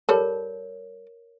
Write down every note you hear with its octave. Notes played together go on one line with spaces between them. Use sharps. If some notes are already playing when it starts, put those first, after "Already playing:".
G3 A4 A#4 C#5